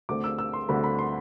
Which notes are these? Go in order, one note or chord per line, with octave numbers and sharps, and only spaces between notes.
D2 D3 A3 C4 D6
E6
E6
C6
D2 D3 A3 C4 B5
B5
C6